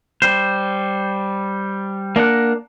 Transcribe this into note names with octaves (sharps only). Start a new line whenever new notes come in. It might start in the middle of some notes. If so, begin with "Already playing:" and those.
G3 C5
A#3 D4 A#4 F#5